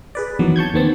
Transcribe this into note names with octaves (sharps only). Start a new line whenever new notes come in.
G#4 B4 D5
F2 D#3 E3 F#3 B3
A5 C#6 G6 G#6
D#2 D#3 B3 C4 A5